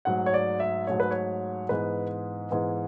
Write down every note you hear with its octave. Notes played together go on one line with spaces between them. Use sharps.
G#2 F#3 A3 F#5
C#5
D5
E5
G#2 F#3 A3 C#5
B4
C#5
G#2 E3 G#3 B3 B4
G#2 E3 G#3 B3